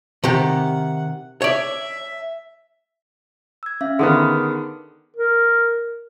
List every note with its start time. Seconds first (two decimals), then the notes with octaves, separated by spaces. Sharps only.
0.24 C3 D#3 G4 F#5
1.42 C#5 D5 E5
3.63 E6 G#6
3.81 C#4 E5 F5
3.99 D3 D#3 B3 G#4 D#6 F6
5.17 A#4